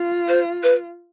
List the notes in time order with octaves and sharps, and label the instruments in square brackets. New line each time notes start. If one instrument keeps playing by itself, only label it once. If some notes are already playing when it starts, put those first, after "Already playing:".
Already playing: [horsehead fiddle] F4
[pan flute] C5
B4